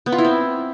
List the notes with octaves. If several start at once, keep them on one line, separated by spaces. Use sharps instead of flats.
B3
F4
E4
C4